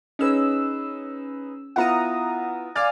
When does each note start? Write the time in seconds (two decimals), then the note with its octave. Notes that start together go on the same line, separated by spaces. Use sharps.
0.19 C#4 D#4 G#4 B4 E6
1.76 B3 E4 F4 F#5 A#5 D#6
2.75 D5 F5 G#5 D6 F6 A6